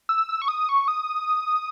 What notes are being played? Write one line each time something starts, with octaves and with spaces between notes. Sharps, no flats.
E6
E6
C#6
D#6
C#6
D#6